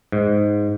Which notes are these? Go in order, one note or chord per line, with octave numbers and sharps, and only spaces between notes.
G#2